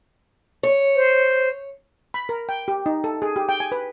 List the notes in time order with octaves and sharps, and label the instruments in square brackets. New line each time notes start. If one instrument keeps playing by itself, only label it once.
[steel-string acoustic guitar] C#5
[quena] C5
[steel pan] B5
A#4
G5
G4
D#4
A4
G#4
G4
G5
G#5
B4